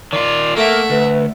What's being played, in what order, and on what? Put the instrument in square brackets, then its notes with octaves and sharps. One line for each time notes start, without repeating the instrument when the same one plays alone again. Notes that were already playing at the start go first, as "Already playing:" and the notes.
[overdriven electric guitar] D#3 F4 [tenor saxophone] D5
[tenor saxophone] A3 [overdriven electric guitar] A#3 [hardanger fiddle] E5 F#5
[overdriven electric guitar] D2 [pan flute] B4